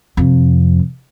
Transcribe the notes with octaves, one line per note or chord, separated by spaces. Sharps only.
F2 C3